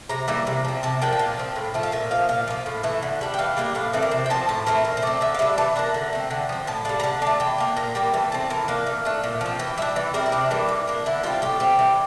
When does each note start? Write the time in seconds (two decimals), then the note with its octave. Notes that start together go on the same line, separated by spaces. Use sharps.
0.09 C3 A#5
0.28 E3 G3 A#3
0.47 C3
0.65 F3 C4
0.83 C3 A5
1.01 F3 A#3 D4 G5
1.13 G5
1.19 A#2 F5
1.38 F3 C4
1.56 A2
1.74 F3 A3
1.83 F5
1.92 A#2 E5
2.11 F3 A#3 F5
2.29 A#2 F5
2.47 F3 A#3
2.66 A2
2.83 E3 A3
3.03 D3
3.21 G3 D4
3.34 G5
3.39 E3 F5
3.57 G3 A#3 D4
3.75 A2 F5
3.93 E3 A3 C4 D5
4.02 A#4
4.11 C3 C5
4.26 G5
4.30 F3 C4 A5
4.49 A2 A5
4.66 E3 A3 C4 A#4
4.85 A#2
4.97 C5
5.02 A3 C4 D5
5.21 D3 E5
5.34 F5
5.39 G3 D4 E5
5.58 E3 A5
5.76 A#3 D4 A#5
5.94 D3
6.13 A3 C4
6.31 D3
6.49 F3 C4
6.67 A2 A5
6.85 G3 D4 F5
7.00 A#5
7.03 D3 A5
7.22 A3 D4 A5
7.40 E3 G5
7.58 A#3 D4
7.77 A#2 A#5
7.95 G3 A#3 G5
8.14 E3 A5
8.32 A3 C4 A5
8.50 E3 A#4
8.68 A#3 D4 F5
8.86 E3
9.05 A3 D4
9.24 A#2
9.41 F3 C4
9.59 E3 G5
9.78 G3 D4 E5
9.96 E3 D5
10.14 G3 C4 A#4
10.26 E4
10.32 C3 D4
10.51 E3 G3 A#3
10.69 E3
10.87 A#3 D4
11.06 D3 E4
11.23 G3 C4 F4
11.42 A2 G4
11.60 G3 C4
11.79 E3